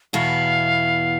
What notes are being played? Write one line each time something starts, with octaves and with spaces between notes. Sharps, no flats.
E2 B2 B3 E4 F5